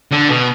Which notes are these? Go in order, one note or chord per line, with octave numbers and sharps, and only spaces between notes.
D3
B2